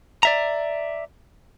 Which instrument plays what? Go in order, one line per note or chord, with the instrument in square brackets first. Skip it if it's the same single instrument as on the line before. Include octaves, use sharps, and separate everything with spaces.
[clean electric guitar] D5 E5 A#5